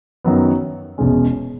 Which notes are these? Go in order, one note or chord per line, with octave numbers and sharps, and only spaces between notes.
F#2 D#3 F#3 B3
E1 E2 B2 G#3 C#4